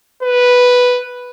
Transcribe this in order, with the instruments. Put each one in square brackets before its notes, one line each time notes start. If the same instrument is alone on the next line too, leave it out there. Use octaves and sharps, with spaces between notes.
[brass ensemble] B4